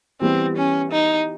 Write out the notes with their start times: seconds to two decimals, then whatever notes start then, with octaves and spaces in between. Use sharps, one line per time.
0.21 E3 G3 B3 C4
0.56 C#4
0.92 D#4